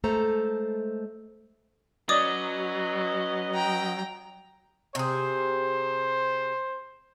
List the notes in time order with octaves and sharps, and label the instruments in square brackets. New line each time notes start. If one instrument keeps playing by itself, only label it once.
[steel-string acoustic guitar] G#3 A3 A4 C5 A#5
[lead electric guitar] F#3 [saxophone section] C#4 B4 D#5 [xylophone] D5 D6 D#6
[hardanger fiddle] G5 A#5
[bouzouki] C3 G#4 [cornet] C5